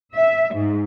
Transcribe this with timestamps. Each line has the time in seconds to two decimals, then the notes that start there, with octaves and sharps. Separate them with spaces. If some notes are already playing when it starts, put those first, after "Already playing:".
0.13 E5
0.54 G#2